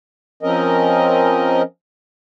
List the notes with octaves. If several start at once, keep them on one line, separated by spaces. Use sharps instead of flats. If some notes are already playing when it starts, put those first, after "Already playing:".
F3 C4 C#4 A#4 D#5